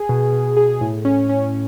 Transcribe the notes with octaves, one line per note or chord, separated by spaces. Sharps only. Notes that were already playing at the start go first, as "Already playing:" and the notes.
Already playing: G#4
B2
B2
G#4
A2
C#4
C#4